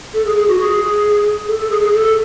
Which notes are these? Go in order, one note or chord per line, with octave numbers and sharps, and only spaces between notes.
A4
G#4
G#4
F#4
G#4
A4
A4
G#4
G#4
A4